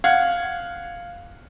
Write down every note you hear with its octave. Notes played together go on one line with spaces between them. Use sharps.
F5 F#5 G#6